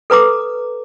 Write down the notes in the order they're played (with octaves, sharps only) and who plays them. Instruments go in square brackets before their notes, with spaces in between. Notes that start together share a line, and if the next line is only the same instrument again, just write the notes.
[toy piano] A4 B4 A#5 D6